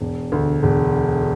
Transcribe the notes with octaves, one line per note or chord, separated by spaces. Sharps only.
E1
D2
E1